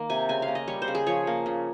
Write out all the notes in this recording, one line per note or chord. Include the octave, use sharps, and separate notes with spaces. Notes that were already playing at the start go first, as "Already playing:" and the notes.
Already playing: D#3 A#3
C3 G#5
C#3 G#5
F5
A#3
D#5
G3 C#5
C5
C#3
G#4
F3 C#5
A#3
C#3